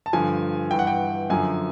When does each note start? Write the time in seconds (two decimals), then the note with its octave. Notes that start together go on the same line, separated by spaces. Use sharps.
0.06 A5
0.13 G2 D3 F3 G#5
0.71 G2 E3 G5
0.79 F#5
0.87 G5
1.30 F#2 D3 F3 G#5